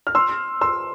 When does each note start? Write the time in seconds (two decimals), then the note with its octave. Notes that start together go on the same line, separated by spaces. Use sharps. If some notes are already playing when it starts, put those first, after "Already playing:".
0.07 F6
0.15 C6 E6
0.61 C6 E6